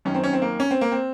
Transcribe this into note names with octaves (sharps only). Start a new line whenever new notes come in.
F#2 D#3 C#4
C4
C#4
C4
A#3
C#4
C4
A#3
C4